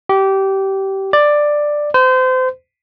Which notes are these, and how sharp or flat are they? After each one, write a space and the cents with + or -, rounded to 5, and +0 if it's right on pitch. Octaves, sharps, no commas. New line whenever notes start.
G4 -20
D5 +10
C5 -30